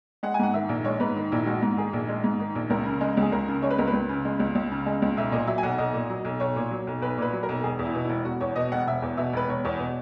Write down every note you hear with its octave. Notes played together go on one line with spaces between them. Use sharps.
G#3 F#5
G#5
G#2 F#5
D#3 E5
A#1
G#3 C#5
G#2 B4
D#3
A#1 E4
G#3 F#4
G#2
D#3 G#4
A#1
G#3
G#2
D#3
A#1
C#2 A#4
C#3
G#3
C#2 G#4
C#2 A#4
C#3
G#3 C#5
B4
C#2 A#4
B4
C#2
C#3
G#3
C#2
C#2
C#3
G#3
C#2
B1 E5
A#2 D#5
F#3 E5
G#5
B1 F#5
B1 D#5
A#2
F#3
B1
B1 C#5
A#2
F#3
B1
B1 B4
A#2 B4
F#3
A#4
B1
E1 G#4
E2
E4
B2
E4
E1
E1 F#4
E2 C#5
B2 D#5
E1 F#5
E1 E5
E2
B2 E5
E1 B4
E1 C#5
E2 C#5
B2